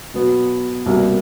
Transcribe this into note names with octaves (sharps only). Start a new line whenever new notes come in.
B2 F#3 B3
C2 B2 G3 A#3